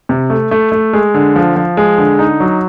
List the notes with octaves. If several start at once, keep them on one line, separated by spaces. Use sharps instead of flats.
C3
A3
A3
A3
G#3
D3
F3
F3
G#3
D3
D#4
F#3